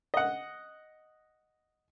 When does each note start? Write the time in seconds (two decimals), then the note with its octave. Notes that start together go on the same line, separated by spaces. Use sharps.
0.14 D#5 F#5